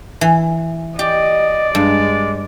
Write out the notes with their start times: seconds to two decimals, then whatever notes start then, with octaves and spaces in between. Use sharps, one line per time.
0.21 E3
0.99 G4 D5 D#5
1.75 G2 G#3